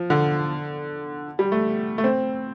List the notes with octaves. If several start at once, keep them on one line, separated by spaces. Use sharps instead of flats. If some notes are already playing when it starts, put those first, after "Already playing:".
Already playing: F3
D3
G3
A3
A3
C4